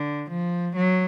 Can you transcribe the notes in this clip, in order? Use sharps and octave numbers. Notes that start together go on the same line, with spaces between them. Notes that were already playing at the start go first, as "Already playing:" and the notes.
Already playing: D3
F3
F#3